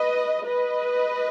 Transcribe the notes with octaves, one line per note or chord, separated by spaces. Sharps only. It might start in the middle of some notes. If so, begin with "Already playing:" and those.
Already playing: B4 D#5
B4 D#5